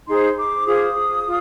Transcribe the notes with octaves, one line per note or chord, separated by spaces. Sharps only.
D#4 G#4 C5 C6
D6
F4 G#4 C5 D#6
F4